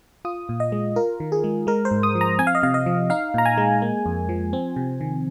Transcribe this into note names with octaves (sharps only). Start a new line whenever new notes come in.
F4 D#6
A#2
D#5
G#3
F4 A#4
D#3
G#4
G#3
G#3 A#4
C5
G#2
D#6
F3
A#5
C4 G#5
F5
D#5
C3 F5
D#5
F3
D#4 F5
A#2 A#5
G#5
G#3
A#3
F2
F3
C4
C3
D#3